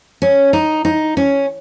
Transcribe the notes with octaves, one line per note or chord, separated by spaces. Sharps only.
C#4
D#4
D#4
C#4